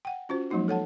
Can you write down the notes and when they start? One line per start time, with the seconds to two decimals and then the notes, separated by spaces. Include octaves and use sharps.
0.05 F#5 G5
0.29 C#4 F4 F#4 C5
0.50 F3 F#3 G#3 A#3 D#4 F#4
0.68 A4 C#5 F#5 A5